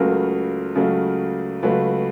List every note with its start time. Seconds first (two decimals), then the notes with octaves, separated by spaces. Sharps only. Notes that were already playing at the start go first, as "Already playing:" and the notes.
Already playing: C#2 C#3 F#3 A3 A#4
0.75 C#2 C#3 F#3 A3
1.63 C#2 C#3 F#3 A3 B4